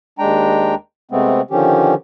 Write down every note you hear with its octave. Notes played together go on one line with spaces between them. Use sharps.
D#2 G#3 D4 G5 A#5
C3 G#3 A3 B3 C4
D3 D#3 F3 C#4 G4